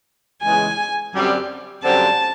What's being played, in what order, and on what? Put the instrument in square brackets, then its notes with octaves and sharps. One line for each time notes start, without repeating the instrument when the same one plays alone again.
[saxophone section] E2 C#3 E3 G#3 [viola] G#5
[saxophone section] F#2 D3 G3 C4
[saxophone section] F#2 D3 G3 C4 [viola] A5